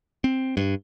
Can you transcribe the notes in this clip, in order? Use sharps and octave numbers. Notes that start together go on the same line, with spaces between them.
C4
G2